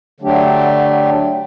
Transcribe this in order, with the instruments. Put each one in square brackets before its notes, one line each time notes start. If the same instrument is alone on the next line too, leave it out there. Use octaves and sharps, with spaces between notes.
[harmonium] D3 F#3 A3 D4 G4